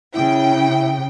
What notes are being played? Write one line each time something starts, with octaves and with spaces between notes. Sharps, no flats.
C#3 E4 G5